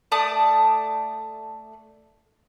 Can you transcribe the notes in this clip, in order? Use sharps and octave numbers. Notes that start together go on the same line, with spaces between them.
A3 D5 A5 D#6